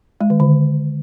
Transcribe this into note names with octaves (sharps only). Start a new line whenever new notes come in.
G#3
D#3
D3